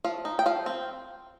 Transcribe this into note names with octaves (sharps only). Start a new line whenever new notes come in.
F3 F5
D#4
G5
F3 F5
C4